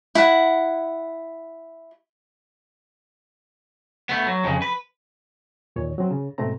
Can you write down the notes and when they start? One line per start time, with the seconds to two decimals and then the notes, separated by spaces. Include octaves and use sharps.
0.15 E4 F#5
4.09 A3 B3
4.27 F#3
4.44 F2 C#3
4.62 B4
5.76 D#2 A#2 C#5
5.98 F#3 C4
6.11 C#3
6.38 G#2 B2 A3 C4 A#5